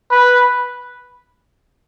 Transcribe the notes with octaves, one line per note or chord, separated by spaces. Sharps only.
B4